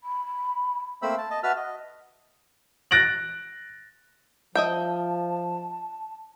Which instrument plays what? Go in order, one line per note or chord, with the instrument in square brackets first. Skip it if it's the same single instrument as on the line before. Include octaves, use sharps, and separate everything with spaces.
[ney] B5
[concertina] A3 A#3 C4 C5 B5 E6
A5
D#5 A5
F#4 B4 E5 A5 E6 F6
D#5
[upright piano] F#6 A6 A#6 D7 F#7
[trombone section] F3 [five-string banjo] D#5 E5 G5 [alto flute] A5